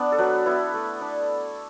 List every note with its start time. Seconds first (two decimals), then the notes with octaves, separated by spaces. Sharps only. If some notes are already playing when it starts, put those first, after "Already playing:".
Already playing: B3 D4 D5
0.12 A4
0.18 F#3 B4
0.46 B3 E4
0.74 A3
1.01 D4